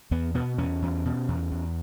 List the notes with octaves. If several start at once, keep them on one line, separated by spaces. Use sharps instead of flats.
E2 B3
B2 B3
E2 C#4
E2
B2
E2
E2